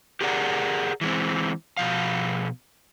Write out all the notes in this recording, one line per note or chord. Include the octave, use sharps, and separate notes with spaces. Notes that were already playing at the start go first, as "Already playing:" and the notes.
G4 G#4 A#4 D5 E5 F#5
E3 G#3 C4
B2 F3 F5